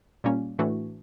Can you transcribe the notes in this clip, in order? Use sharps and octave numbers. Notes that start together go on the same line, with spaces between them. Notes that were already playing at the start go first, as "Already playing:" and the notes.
A#2 G3 A#3 C#4
A2 E3 A3 D4 F#4